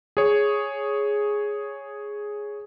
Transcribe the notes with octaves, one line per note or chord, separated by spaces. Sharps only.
G#4 C#5